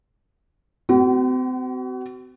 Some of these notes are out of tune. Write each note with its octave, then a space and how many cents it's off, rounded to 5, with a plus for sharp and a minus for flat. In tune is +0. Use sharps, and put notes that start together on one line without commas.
C4 -40 F#4 +35